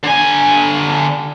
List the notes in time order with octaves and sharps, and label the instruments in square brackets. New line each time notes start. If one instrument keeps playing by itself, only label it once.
[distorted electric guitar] D3 G#5